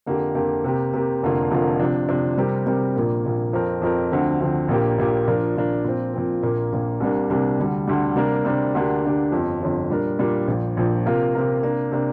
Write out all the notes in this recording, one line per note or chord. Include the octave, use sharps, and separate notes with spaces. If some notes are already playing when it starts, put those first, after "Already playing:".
F2 D3 A#3 G4
F2 D3 A#3 G4
C3 A#3 G4
C3 A#3 G4
F1 F2 D3 A#3 F4
F1 F2 D3 A#3 F4
C3 F3 D4
C3 F3 D4
C3 G3 C4 G4 A#4
C3 G3 C4 G4 A#4
A#1 A#2 A#3
A#1 A#2 A#3
F2 F3 C4 A#4
F2 F3 C4 A#4
D2 D3 F3 C4
D2 D3 F3 C4
A#1 A#2 A#3 G4
A#1 A#2 A#3 G4
A#2 F3 D4 A#4
A#2 F3 D4 A#4
A#2 F3 C4
A#2 F3 C4
A#1 A#2 A#3
A#1 A#2 A#3
C2 C3 G3 A#3 D4
C2 C3 G3 A#3 D4
D2 D3 G3
D2 D3 G3
C3 G3 A#3 D4 A#4
C3 G3 A#3 D4 A#4
D2 D3 A#3 D4 G4
D2 D3 A#3 D4 G4
G1 F2 F3
G1 F2 F3
A#2 G3 D4 A#4
A#2 G3 D4 A#4
A#1 A#2 F3
A#1 A#2 F3
C3 A#3 F4 A#4
C3 A#3 F4 A#4
C3 A#3 D4
C3 A#3 D4